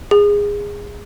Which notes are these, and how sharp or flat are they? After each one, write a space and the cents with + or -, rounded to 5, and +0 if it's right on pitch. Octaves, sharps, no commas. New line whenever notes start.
G#4 -20